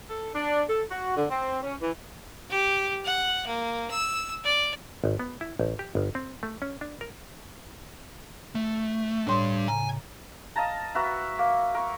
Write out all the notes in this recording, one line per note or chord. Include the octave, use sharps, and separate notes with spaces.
A4
D4
A4
F#4
D3
C4
C#4
E3
G4
F#5
A#3
E6
D5
G#1
B3
E4
A1
G4
G1
C4
A3
C#4
D4
A#4
A3
A2 G3 D4 C#5 C6
C#3 G#5 A#5
D#5 F5 A5 A#5
F#4 A#4 B4 E5
A#3
A#4 C#6